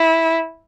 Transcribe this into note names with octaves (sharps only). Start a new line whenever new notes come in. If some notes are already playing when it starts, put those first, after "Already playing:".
Already playing: E4